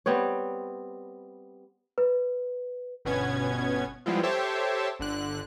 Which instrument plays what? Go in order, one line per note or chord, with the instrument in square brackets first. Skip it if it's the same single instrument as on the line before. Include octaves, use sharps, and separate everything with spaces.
[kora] G3 B3 C4 C#5
[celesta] B4
[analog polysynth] G1 B2 B3 C#4 G#6
F3 G3 G#3 B3 E4 F4
G4 A4 C5 C#5 E5 A5
G1 D3 F#6